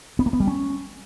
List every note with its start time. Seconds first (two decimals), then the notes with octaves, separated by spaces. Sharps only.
0.19 B3
0.26 A#3
0.33 B3
0.40 G3
0.47 C#4